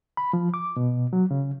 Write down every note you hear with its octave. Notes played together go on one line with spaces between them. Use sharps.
B5
F3
D6
B2
F#3
C#3